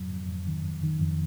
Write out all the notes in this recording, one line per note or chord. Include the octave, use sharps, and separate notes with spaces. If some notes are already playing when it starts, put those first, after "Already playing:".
Already playing: F2 F#3
F2
F2
D#3
F2
D#3
F2